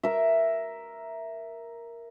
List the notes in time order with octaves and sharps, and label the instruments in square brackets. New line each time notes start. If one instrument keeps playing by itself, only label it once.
[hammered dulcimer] A#4 E5